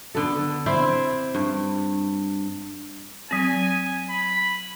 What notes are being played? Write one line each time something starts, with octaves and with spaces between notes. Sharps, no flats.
D3 B3 A4
C4 E4 C5 D5
G2
F#3 C4 G#5
B5